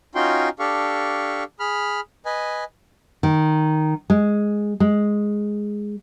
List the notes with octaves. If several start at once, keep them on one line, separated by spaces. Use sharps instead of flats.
C#4 D#4 F4 F#4 G5 C6
D4 G4 A4 F5 C#6
G#4 B5 F6
B4 D#5 G#5
D#3
G#3
G#3